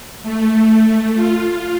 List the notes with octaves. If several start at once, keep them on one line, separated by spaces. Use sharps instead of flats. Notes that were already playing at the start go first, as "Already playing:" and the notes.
A3
F4